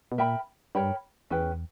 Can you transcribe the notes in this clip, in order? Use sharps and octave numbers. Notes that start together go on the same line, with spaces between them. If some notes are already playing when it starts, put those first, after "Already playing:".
B2
A#2 A#4 E5 G5 B5
G2 A#4 C#5 G5 B5
E2 C#4 G#4 B4 G5